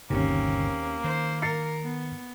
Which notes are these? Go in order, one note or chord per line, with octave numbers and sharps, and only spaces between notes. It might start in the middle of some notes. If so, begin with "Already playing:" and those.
G1 D#2 C3 A#3 C4 C#4
D#3 C5
A#4 A6 C7 C#7
B3